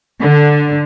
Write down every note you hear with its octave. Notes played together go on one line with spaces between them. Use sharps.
D3